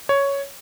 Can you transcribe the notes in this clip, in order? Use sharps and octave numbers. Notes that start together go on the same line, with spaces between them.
C#5